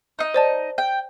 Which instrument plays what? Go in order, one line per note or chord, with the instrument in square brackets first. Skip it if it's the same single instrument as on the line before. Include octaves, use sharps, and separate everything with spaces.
[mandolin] D#4 D#5
[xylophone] C5 D5 A5
[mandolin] G5